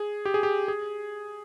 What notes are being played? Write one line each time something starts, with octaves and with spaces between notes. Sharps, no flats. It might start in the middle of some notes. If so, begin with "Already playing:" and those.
Already playing: G#4
G4
G#4
G4
G#4